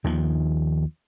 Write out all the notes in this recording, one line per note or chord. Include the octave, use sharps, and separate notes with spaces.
D#2 D#3 F3